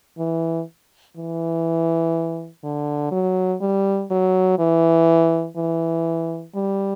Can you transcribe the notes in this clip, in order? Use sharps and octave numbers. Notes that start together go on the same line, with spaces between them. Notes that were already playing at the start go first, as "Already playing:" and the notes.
E3
E3
D3
F#3
G3
F#3
E3
E3
G3